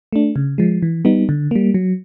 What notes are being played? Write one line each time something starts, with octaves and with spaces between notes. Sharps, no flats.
A3 D4
C#3
F3 G#3
E3
G3 B3 D#4
D3
G3 A#3
F#3